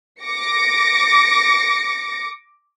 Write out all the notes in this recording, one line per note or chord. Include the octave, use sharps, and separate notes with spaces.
D6 A#6 C#7